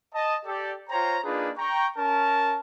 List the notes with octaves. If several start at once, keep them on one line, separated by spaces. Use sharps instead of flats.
D#5 A5
G4 A4 D5
F4 C5 C#5 G5 A#5
A#3 D4 D#4 F4 G#4 B4
G5 A#5 C#6
C#4 A#4 A5